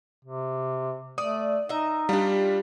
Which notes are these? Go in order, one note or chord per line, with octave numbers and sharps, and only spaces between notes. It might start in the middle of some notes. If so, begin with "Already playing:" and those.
C3
A3 D5 D#6
D#4 D#5 E5
G3 D4 F4 G4